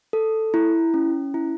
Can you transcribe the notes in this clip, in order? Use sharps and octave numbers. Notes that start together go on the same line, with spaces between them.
A4
E4
C#4
E4